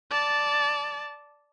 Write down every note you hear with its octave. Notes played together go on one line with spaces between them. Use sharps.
D5 A5